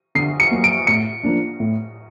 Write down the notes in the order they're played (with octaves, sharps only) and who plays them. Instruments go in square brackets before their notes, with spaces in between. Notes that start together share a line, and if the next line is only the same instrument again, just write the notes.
[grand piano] D3 [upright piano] C7
[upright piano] C#7
[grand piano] F#3 A#3
[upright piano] D7
[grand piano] A2 [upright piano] C#7
[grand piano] F3 A#3 D4
A2